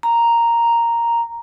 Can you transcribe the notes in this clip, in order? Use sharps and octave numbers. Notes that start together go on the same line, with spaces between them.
A#5